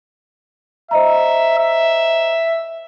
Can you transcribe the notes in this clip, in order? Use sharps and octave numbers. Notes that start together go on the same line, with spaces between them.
C5 D#5 E5 A#5
E5